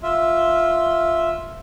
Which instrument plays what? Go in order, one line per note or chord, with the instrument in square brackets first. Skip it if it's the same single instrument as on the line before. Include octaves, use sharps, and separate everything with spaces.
[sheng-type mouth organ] F4 E5